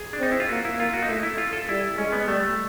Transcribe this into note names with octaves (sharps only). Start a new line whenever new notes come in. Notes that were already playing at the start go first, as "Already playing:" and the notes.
Already playing: G#4
D4
C4 D#4
E4
F4
A#3 F#4
E4
A#3 F4
F#4
D#4
A3 E4
E4
F4
A4
G3 E4
G#3 C#4
B3
G3 A3